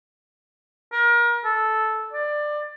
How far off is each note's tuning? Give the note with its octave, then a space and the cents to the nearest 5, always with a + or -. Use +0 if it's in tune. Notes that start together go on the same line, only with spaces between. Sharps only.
A#4 +30
A4 -10
D5 +20